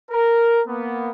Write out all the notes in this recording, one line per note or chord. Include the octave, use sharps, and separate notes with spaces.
A#4
A#3 B3